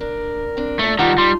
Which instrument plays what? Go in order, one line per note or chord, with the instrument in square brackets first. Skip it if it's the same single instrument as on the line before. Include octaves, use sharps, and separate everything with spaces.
[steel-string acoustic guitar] D4 [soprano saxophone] A#4
[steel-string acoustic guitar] C4 D4
[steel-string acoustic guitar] A#2 D#5 [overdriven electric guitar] A3
[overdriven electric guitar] D#3 G3 [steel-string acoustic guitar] D#4 F4 A5 [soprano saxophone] F#5
[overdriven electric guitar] G3 [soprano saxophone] C6